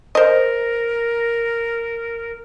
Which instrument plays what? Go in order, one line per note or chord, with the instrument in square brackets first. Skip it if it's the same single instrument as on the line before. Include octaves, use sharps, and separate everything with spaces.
[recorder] A#4 [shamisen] C5 D#5